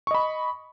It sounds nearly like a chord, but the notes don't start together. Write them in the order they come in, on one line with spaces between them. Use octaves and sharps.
C#6 D#5 B5